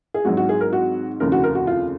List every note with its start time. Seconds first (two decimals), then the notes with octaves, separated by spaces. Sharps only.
0.14 G#4
0.25 G#1 G#2 F#3 F#4
0.37 F#4
0.49 G#4
0.61 A#4
0.73 F#4
1.20 F1 D#2 C#3 A#4
1.32 F#4
1.44 A#4
1.55 F#4
1.67 F4